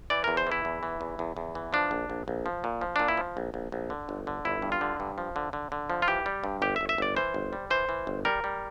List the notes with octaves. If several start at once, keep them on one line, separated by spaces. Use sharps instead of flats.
E3 D5
E2 A#4
C5
E3 E4
E2
E3
E2
E2
E2
E3
F3 D4
A#1
A#1
A#1
F3
A#2
F3
A#2 D4
E4
F3
A#1
A#1
A#1
D3
G1
D3
G1 E4
G2
F4
D3
G2
F3
D3
D3
D3
F3
F4
E3 G4
G3
G2
G1 G4
E5
G1
E5
G1 D5
E3 C5
G1
G3
E3 C5
E3
G1
G3 A#4
G3